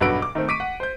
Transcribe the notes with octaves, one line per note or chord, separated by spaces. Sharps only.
B1 G2 F#4 B4 E6 D7
D6
D#3 A3 C4
C#6 D6 B6 D7 D#7
F#5
C5 G6